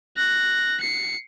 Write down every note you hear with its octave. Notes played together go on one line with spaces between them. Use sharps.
F#6 A#6
C7 C#7